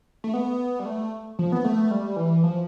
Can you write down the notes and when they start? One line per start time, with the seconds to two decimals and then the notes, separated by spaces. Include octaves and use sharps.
0.24 A3
0.34 B3
0.79 G3
0.86 A3
1.39 F3
1.52 B3
1.65 A3
1.91 G3
2.16 E3
2.44 F3